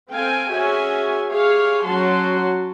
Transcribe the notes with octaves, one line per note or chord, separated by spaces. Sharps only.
C4 A4 F5 G5 G#5
C#4 F#4 G#4 E5 G#5
G4 G#4 C#5 F5
F#3 C#4 F#4 A5 C6